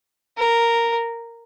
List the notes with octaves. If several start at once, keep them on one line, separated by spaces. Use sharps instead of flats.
A#4